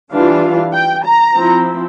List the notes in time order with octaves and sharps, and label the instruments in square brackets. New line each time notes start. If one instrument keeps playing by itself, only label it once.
[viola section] E3 G3 D4 F4 F5
G5
A#5
F3 C4 E4